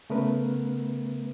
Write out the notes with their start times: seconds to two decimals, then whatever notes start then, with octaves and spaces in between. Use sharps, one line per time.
0.10 C#3 A3 B3 A#4 B4